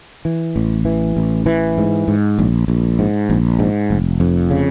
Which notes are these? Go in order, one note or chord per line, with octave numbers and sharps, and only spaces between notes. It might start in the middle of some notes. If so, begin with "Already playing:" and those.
E3
A1
E3
A1
E3
G#2
G#2
A#1
A#1
G#2
A#1
G#2
F1
F2
C#3